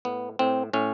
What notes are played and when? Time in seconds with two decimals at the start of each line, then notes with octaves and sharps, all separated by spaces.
0.05 A2 B3
0.39 A2 C4
0.73 A2 C#4